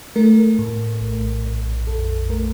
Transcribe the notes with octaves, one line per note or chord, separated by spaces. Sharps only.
A3 A#4
A2
A#1
A#1
F2 A4
A3 A#4